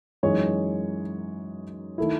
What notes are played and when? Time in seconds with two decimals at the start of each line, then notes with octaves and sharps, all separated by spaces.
0.23 F#2 E3 G#3 D#4 C#5
1.98 D#3 A3 E4